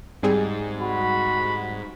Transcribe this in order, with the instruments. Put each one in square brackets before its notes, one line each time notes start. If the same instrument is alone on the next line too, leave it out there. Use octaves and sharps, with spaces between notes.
[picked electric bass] G#2 [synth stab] G3 C4 G#4
[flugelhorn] F#4 [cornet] B5